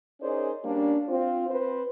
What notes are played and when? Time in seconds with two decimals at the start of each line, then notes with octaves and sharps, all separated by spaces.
0.21 C#4 D#4 G#4 A#4 C5 D5
0.64 G3 A#3 C#4 D4
1.09 C4 F4
1.48 C4 B4 C5